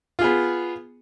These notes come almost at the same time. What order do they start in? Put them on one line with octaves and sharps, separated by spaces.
F4 G#4 B3